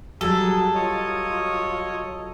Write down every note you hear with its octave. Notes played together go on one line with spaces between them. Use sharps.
F#3 G3 F#4 G#4 A4
F4 C#5 D#5